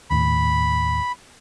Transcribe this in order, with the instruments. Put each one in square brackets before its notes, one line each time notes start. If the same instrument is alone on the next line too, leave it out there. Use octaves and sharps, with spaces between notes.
[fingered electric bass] D#1 D#2 A2 [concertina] B5